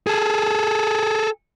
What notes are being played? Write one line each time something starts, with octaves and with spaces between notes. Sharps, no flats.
G#4 A4